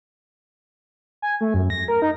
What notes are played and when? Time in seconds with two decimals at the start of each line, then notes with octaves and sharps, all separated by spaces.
1.22 G#5
1.41 A3
1.54 F#2
1.70 A#6
1.88 A#4
2.02 D#4